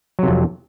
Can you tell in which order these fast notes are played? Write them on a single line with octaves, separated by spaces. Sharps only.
F#3 C3 F2